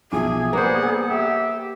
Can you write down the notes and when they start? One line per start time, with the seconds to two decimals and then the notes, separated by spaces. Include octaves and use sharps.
0.12 B1 F3 G#4 E5 G#5 D6
0.53 G3 A#3 B3 C5 F#5
1.08 G4 E5 F#5